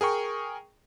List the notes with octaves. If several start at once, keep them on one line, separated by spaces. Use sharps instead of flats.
G#4 A#4 G5 C#6